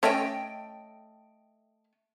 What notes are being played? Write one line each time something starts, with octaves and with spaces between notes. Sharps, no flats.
A3 C#4 A4 C#5 D#5 G5